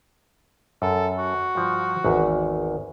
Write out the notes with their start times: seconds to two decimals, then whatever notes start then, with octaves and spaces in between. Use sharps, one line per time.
0.82 F#2 A4
1.18 F#4
1.55 G2 F3
2.04 G#1 E2